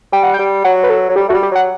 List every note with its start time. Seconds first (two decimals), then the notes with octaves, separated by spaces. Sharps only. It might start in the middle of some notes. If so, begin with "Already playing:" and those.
0.12 G3 G5
0.23 F#5
0.34 G5
0.39 G3
0.64 F#3 F#5
0.83 B4
0.90 A4
1.09 F#3
1.16 G3 G4
1.29 A3 F#4
1.34 G3
1.43 G4
1.51 F#3 F#5